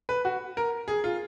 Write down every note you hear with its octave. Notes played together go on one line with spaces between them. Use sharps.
B4
F#4
A#4
G#4
F4